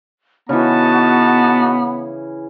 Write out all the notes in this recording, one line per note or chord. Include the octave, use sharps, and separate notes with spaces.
C#3 E3 B3 D#4 F#4 A5